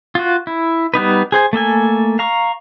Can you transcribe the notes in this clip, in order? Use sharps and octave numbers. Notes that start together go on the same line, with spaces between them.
F4 F#4
E4
G3 B3 D#4 B4
G#4 C5 G#5
A3 A#3 A4 G#5
F5 A#5 C#6